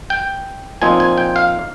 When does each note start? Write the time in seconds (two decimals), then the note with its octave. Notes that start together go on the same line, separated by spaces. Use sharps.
0.10 G5
0.82 A#2 F3 C4 D#4 G#5
1.00 G#5
1.18 G5
1.36 F5